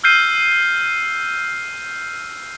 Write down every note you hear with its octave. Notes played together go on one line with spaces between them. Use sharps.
E6 F6 G6 C7 D#7